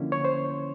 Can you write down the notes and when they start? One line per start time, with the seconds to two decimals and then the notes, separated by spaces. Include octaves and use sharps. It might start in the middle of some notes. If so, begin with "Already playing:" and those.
Already playing: D3 F3 A#3 C#4 E4
0.12 C#5
0.25 C5